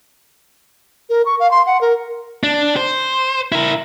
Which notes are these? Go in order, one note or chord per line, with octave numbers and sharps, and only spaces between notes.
A#4
C#6
F5
C6
F#5
A#4
D4
C5
E4 A#4